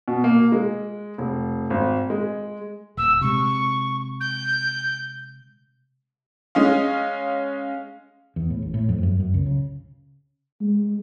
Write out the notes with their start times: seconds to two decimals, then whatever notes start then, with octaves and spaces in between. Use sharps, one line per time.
0.08 B2
0.24 A#3
0.52 G#3
1.18 F1
1.70 G#1
2.10 G#3
2.97 D#1 E6
3.21 C3 G#3 C#6
4.20 G6
6.55 G#3 C#4 D#5 F5
8.36 E2
8.50 A2
8.62 A1
8.74 A2
8.89 F2
9.03 F#2
9.20 F#2
9.34 C#2
9.46 C#3
10.61 G#3